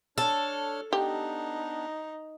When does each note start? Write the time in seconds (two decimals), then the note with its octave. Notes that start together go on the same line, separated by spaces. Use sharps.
0.18 D4 A4 C#5 F6
0.93 B3 D4 D#4 G4